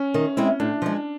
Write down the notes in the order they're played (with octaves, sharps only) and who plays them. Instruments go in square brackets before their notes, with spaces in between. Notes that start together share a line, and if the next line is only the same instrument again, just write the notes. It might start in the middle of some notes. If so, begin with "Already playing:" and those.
Already playing: [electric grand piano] C#4
[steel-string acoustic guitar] D#3
G#3 C4 E4
[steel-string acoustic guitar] A2 [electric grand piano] D4
[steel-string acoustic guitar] F3 G#3